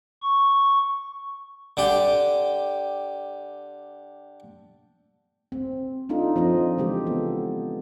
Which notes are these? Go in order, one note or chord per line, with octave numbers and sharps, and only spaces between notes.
C#6
D3 G4
C4
D4 D#4 F4 A4
F3 C4 D#5
C#3 E3 G#3 G4
B3 A4